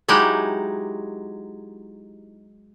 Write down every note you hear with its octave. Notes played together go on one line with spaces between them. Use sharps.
F#3 G#3 D#4 E4 G4